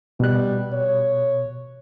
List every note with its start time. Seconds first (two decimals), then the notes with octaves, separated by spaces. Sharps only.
0.20 B2 G3 F#6
0.73 C#5